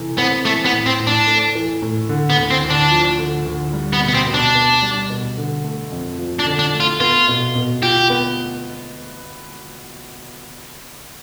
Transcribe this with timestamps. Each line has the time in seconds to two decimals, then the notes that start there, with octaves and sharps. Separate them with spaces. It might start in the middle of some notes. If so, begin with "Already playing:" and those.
Already playing: C3 E3 A3
0.18 B3 C4
0.45 E3 A3
0.65 B3
0.73 A2
0.86 C4
1.00 A2
1.07 D4
1.27 A3
1.55 E3
1.82 A2
2.09 D3
2.30 B3
2.37 D2
2.51 C4
2.64 D2
2.70 D4
2.91 F3
3.18 D3
3.46 D2
3.73 G3
3.93 B3
4.01 B2
4.08 B3
4.14 C4
4.27 B2
4.34 D4
4.55 B3
4.82 G3
5.10 B2
5.37 D3
5.64 A3
5.91 F2
6.18 F3
6.39 D4
6.46 D3
6.59 D4
6.74 A3
6.80 F4
7.00 B3 F4
7.28 B2
7.55 B2
7.82 F4 G4
8.10 B3